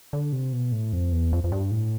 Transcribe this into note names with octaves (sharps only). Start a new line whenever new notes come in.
D3
C3
B2
A2
F2
E2
F2
F2
G2
A2